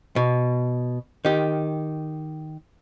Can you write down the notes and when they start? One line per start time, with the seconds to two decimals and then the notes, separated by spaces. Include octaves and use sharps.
0.16 B2
1.25 D#3 G4